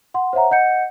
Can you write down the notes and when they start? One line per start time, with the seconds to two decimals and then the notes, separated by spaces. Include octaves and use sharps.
0.14 F#5 C6
0.33 C5 C#5 E5 F#5 A#5
0.51 D#5 F#5 G6 C#7